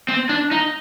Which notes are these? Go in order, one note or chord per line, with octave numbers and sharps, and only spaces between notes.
C4
D4
D#4